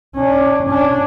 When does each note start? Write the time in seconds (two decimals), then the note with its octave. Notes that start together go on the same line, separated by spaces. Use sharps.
0.15 C#4 D4
0.69 C#4 D4